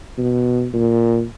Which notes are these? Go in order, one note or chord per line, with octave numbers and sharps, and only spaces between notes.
B2
A#2